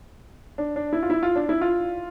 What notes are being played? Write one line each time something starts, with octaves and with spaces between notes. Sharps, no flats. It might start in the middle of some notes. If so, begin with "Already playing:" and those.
D4
D4
E4
F4
E4
F4
D4
E4
F4